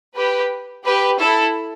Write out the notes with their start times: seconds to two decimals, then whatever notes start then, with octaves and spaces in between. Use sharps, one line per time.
0.16 G4 B4
0.85 G4 B4
1.19 E4 A4